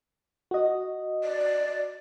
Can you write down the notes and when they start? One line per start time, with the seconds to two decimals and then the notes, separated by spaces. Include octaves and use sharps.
0.51 F#4 D#5
1.24 D5